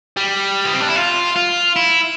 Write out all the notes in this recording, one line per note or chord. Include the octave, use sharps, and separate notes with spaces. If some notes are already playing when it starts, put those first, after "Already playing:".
G3
B3
C4
D4
E4
F4
F4
E4